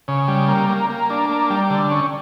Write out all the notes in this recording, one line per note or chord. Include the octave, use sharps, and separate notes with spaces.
C#3
G3
A#3
A#3
A#3
D4
A#3
G3
D3
C#4